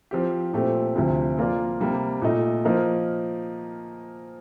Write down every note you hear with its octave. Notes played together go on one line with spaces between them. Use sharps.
F3 C4 G4
A#2 A3 C4 G4
D2 C3 F3
F3 A#3 F4 A#4 D5
C3 G3 A#3
A#2 A3 D#4
F3 A#3 D#4 A#4